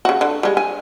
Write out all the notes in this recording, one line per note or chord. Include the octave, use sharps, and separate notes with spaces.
C#3 F#4
D3
G3 G#3
G#5